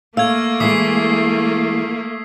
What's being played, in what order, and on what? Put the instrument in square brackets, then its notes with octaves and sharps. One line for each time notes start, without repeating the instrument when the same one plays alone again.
[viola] A3 [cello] A#3 [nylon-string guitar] F5 [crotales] E6 G#6
[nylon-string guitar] E3 G#3 [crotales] D#6 B6 C7